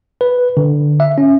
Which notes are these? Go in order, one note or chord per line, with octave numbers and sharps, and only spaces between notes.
B4
D3
E5
C#4